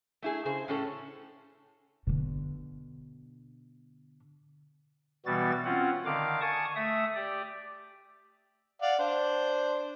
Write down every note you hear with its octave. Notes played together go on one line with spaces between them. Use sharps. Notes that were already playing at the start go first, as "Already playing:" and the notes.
A3 E4 G#4
C#3 G#4 C5
A2 C#4 A4
B2 D3
B2 E3 G3 B3 F#4 A6
C4 C#4 F4 F#5
D3 D#3 F5 D6
G#5 A5 C#6 D#6
A3 E5 D#6
G4 D5
D5 F5 F#5
D4 C5